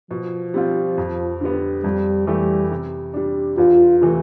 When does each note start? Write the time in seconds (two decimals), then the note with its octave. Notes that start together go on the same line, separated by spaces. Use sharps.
0.11 B2 F3
0.54 G3 C4 F4
0.98 F2
1.41 D3 G3 B3
1.84 F2 G3
2.27 E3 G3 A3 E4 G4
2.72 C3
3.14 G3 D4
3.57 E2 F4
4.01 C3 E3 A3